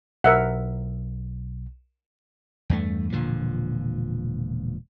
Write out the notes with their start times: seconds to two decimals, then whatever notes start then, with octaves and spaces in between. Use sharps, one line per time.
0.24 B1 A#4 E5 F#5
2.70 E2 G2 A3
3.12 E1 A#2 D3 F3